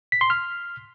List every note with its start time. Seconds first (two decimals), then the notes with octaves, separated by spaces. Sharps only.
0.12 B6
0.21 C6
0.30 F6